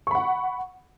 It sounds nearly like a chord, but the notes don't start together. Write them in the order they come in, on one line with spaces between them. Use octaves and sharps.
C#6 B5 F#5